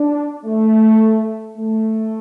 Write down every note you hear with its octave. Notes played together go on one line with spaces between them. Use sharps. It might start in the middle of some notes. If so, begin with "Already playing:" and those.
Already playing: D4
A3
A3